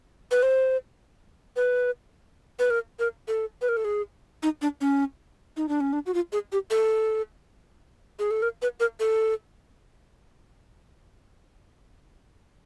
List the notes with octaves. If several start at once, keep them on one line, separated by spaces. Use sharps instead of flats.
B4
C5
B4
B4
A#4
A#4
A4
B4
A#4
A4
G#4
D#4
D4
C#4
D#4
D4
C#4
D4
F#4
F4
G#4
G4
A4
G#4
A4
A#4
B4
A#4
A4